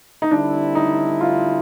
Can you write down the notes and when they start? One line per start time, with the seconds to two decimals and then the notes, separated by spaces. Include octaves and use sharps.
0.22 D#4
0.31 D3 G3 C4 D4 E4
0.75 D#4
1.21 F4